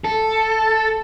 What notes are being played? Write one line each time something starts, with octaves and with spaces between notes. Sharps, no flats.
A4